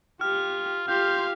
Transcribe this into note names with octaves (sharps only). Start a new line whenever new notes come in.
F4 G4 F6
F4 G4 F5 C6 G6